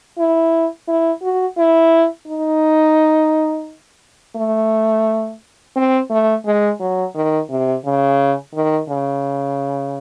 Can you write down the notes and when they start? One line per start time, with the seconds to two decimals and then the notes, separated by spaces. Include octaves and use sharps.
0.18 E4
0.88 E4
1.22 F#4
1.57 E4
2.27 D#4
4.36 A3
5.76 C4
6.10 A3
6.46 G#3
6.80 F#3
7.15 D#3
7.50 C3
7.85 C#3
8.54 D#3
8.90 C#3